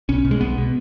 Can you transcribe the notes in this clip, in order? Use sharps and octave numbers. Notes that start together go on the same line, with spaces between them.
B1 C#4
B2
G#3
B1 B3
B2